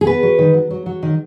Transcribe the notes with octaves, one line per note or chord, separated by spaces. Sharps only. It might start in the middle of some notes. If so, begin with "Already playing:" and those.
G#4
B3 B4
F#3
D#3
F#3
F#3
F#3
D#3